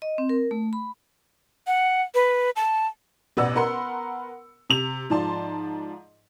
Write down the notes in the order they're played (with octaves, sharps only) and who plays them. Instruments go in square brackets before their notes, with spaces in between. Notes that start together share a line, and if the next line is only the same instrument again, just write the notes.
[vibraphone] D#5
C4
A#4
A3
B5
[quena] F#5
B4
A5
[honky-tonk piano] A1 B2 B4 D5 F#5 E6
B3 A#4 F#5 B5 C6 C#7
C3 F7
G#2 F3 D5 A5 C6